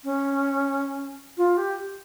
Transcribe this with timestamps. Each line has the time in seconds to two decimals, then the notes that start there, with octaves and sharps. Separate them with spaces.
0.04 C#4
1.37 F4
1.57 G4